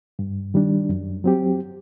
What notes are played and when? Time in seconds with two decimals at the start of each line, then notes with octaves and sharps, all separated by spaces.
0.19 G2
0.54 D#3 G3 D4
0.89 F#2
1.24 F#3 C4 G4